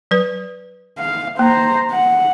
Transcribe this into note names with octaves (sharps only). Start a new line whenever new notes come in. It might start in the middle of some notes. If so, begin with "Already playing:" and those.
F#3 B4
F5
A#3 C5 A#5
F#5